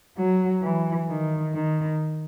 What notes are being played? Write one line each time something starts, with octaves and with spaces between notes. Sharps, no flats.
F#3
E3
D#3
D#3